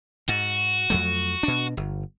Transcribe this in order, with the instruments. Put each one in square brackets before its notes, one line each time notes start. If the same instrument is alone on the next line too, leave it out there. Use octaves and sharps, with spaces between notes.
[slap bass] G#2 [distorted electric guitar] F#4
[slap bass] F2 F#3 A3
B2 D4
G1